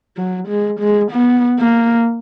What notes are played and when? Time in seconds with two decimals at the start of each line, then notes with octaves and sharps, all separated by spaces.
0.17 F#3
0.48 G#3
0.80 G#3
1.12 B3
1.59 A#3